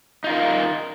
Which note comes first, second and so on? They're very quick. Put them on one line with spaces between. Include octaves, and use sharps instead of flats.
D#4 F4 A#4